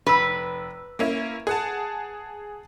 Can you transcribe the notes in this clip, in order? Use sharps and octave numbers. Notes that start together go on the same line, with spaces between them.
F1 B4 E6
A#3 C#4 E4
G#4 F#5 A5